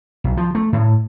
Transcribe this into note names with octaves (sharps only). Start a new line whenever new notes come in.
B1
F3
A3
A2